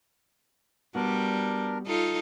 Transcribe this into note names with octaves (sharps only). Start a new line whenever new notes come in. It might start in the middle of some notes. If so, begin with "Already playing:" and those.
G3 B3 D4 F#4 A#4
D#4 F4 A4